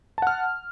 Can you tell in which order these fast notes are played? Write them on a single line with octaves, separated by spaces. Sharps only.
A5 F#5 F6